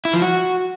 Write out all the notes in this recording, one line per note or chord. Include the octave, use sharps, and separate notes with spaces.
E4
F3
F#4